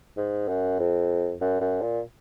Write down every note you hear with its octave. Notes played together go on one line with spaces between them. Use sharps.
G#2
F#2
F2
F#2
F#2
A#2